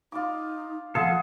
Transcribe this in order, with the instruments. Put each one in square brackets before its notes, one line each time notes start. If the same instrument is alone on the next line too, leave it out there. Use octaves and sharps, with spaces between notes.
[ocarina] D#4 [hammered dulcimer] F4 D6
[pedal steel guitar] F3 F4 A4 [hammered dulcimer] G#4 [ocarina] F#5